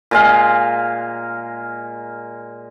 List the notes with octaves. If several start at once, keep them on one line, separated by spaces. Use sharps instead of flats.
A#2 G#3 F5